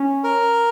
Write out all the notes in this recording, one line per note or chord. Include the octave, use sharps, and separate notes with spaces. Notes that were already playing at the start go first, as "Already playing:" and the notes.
Already playing: C#4
A#4